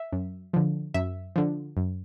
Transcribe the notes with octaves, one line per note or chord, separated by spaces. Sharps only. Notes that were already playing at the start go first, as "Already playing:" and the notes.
Already playing: E5
F#2
D3 F3
F#2 E5
D3 F3
F#2